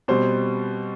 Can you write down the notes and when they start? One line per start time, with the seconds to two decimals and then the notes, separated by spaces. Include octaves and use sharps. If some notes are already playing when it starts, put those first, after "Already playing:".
0.08 B2 G3 C4 C5